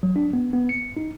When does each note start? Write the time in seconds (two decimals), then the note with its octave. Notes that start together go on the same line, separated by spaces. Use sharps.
0.03 F#3
0.16 D4
0.33 B3
0.53 B3
0.69 C#7
0.97 D#4